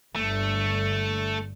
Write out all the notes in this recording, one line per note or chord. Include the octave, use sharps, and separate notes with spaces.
G1 D3 A3